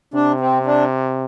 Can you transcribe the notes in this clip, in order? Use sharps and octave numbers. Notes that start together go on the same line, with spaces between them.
C3 D4
C4
D4